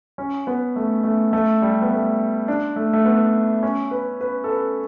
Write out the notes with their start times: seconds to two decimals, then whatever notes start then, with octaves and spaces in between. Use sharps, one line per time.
0.18 C#4
0.47 B3
0.76 A3
1.04 A3
1.33 A3
1.62 G3
1.82 B3
1.91 A3
2.48 D4
2.76 A3
2.93 A3
3.05 B3
3.63 C#4
3.91 B4
4.21 B4
4.44 A4
4.49 B4